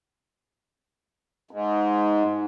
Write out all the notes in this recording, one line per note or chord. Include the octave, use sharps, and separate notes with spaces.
G#2